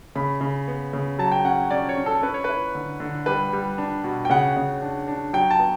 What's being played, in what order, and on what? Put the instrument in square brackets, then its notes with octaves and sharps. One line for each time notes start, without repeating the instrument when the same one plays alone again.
[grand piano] C#3 B5
C#3
B3
C#3
F#3 A5
G5
C#4 F#5
C#4 D5
C#5
C#4
A4
C#4 B4
C#5
E4 B4
D3
D3
G3 B4
G3
D4
B2
G5
C#3 F#5
C#3
D4
D4
F#3 G5
A5
B3